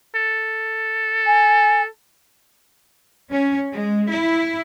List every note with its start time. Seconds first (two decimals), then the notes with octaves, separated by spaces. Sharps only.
0.15 A4
1.26 G#5
3.33 C#4
3.72 G#3
4.10 E4